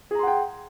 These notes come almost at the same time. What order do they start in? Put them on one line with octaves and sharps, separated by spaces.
G#4 A#5 C6 F#5 G5